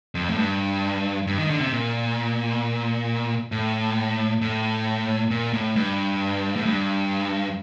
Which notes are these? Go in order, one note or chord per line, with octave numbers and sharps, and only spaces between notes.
F2
A2
G2
G2
D#3
D3
C3
A#2
A2
A2
A#2
A2
G2
A2
G2